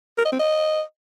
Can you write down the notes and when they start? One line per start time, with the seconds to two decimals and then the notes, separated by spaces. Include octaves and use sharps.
0.18 A#4
0.25 D#5
0.32 C4
0.40 D#5